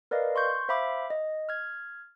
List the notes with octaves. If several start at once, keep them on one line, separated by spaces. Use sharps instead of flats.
A#4 B4 D5 D#5 F5
C6 C#6 G6
C5 E5 F5 B5 D6
D#5
F6 G#6